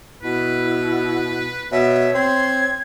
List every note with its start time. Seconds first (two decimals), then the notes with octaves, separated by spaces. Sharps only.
0.23 B2 E4 B4
1.72 B2 C#5 E5
2.14 C4 C6 G#6